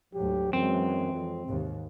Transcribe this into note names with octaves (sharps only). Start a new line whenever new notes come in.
D2 G#2 F#3 G4
F#2 E3 F#3 G#3 C4
F2
D#2 G#2 C3